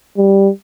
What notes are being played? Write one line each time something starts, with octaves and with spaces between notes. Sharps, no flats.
G3